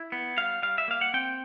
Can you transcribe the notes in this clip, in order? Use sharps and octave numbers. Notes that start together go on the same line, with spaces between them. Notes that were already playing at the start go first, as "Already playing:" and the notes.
Already playing: E4
B3
G3 F5
G3 F5
E5
A#3 F5
F#5
C4 G5